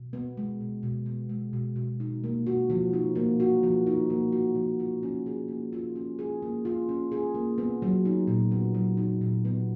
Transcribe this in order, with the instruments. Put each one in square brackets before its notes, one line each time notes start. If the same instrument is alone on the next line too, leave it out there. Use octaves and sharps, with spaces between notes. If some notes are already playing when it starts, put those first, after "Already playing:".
Already playing: [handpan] B2
B3
G#3
B2
B2
B3
G#3
B2
B2
D#4
A#3
F#4
F3
D#4
A#3
F#4
F3
D#4
A#3
F#4
F3
F4
C#4
G#4
A#3
F4
C#4
G#4
A#3
F4
C#4
G#4
A#3
B3
F#3
D#4
A#2
B3
F#3
D#4
A#2
B3